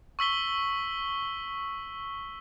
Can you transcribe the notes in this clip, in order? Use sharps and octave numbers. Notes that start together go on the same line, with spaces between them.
C#6 E6 B6 G7